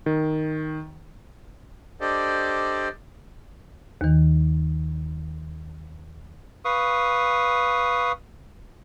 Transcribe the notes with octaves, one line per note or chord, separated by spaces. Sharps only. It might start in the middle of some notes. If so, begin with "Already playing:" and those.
D#3
D4 G4 A4 C5 D5 D#5
D#2 D#3
B4 F5 C#6 D#6